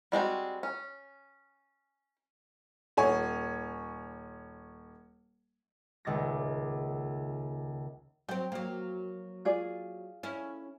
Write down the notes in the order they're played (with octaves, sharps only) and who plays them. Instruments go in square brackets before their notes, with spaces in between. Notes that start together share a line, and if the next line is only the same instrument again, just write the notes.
[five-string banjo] G3 G#3 C4 F#4
C#4
[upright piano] D#1 C#5 G#5
[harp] D#1 C#2 D#4 D6 A6 A#6
[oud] F#3 C4 [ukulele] G5
[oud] F#3 A#3
[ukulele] F4 G#4 D5
[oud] C#4 E4